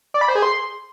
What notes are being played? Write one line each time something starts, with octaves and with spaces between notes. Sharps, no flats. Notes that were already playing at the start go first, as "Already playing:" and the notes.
D5
B5
C5
G#4
C6